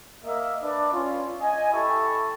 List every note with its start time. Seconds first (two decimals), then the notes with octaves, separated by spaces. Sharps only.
0.25 A#3 D#5 E5
0.61 D4 B4 D5
0.92 C#4 F4
1.39 D#5 G#5
1.72 E4 G4 A4 E5 A5 C#6